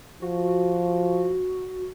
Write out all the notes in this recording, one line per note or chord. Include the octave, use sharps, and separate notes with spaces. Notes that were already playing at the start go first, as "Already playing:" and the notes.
F3 F#4